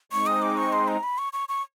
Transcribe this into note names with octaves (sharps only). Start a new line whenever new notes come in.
G#3 C4 D#4 C#6
D#6
D6
C#6
C6
A#5
B5
C#6
C#6
C#6